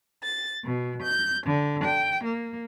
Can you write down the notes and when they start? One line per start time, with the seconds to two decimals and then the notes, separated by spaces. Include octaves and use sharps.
0.22 A6
0.63 B2
1.01 G6
1.46 D3
1.84 G5
2.23 A#3